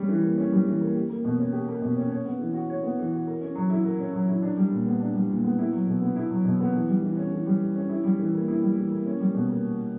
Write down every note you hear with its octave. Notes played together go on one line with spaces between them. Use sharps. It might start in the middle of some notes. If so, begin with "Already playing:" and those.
Already playing: G3 C#4
E3
A#3
C#4
G3
E3
A#3
G4
A#3
B2
C#4
G4
A#3
B2
C#4
C#5
B3
E3
F#4
C#5
B3
E3
F#4
A#4
C#4
F#3
E4
A#4
C#4
F#3
E4
D4
G3
A#2
B3
D4
G3
A#2
B3
E4
F#3
B2
B3
E4
F#3
B2
B3
E3
G3
E3
C#4
E3
G3
E3
C#4
E4
G3
E3
A#3
E4
G3
E3
A#3
C#4
G3
B2
A#3